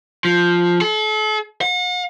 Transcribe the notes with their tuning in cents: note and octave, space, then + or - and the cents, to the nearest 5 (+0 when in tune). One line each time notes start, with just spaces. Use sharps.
F3 +0
A4 -40
F#5 -45